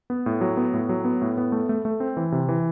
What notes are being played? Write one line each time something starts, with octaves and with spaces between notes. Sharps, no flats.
B3
A2
F#3
B3
A2
F#3
B3
A2
B3
A3
A3
A3
C4
E3
C3
E3